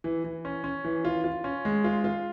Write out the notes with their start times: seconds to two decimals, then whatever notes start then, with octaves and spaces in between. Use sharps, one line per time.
0.04 E3
0.24 E3
0.45 C#4
0.64 C#4
0.85 E3
1.05 F4
1.24 F4
1.44 C#4
1.65 G#3
1.84 F4
2.04 F4